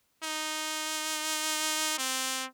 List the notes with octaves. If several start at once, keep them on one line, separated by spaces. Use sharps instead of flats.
D#4
C4